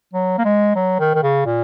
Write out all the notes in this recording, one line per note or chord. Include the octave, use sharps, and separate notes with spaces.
F#3
A#3
G#3
F#3
D#3
D#3
C#3
A#2